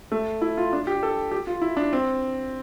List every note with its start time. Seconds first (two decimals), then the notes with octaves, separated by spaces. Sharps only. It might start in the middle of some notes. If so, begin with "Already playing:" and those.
0.12 A3
0.41 E4
0.57 F4
0.73 D4
0.87 G4
1.03 A4
1.32 G4
1.47 F4
1.62 E4
1.77 D4
1.93 C4